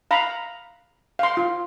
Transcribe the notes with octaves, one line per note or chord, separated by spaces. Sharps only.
F5 A#5 B5
F5 C6
F4